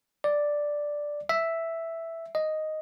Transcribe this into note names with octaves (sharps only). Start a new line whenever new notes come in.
D5
E5
D#5